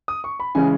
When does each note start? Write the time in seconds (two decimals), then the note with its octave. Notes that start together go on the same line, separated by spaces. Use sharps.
0.08 D#6
0.24 C#6
0.40 B5
0.55 C#3 E3 G#3 C#4 G#5